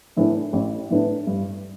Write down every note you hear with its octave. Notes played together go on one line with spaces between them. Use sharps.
A2 E3 B3 D4
A1
A2 E3 B3 D4
G2